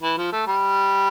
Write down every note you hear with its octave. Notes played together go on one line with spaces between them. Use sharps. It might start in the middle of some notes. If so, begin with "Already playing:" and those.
E3
F3
A3
G3